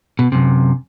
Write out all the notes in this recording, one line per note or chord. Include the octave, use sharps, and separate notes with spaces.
B2
F#2 C3